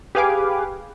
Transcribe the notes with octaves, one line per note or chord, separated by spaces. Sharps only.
G4 G#4 B4 F5 G#5 D6